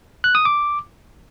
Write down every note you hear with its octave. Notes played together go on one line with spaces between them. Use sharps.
F#6
D#6
D6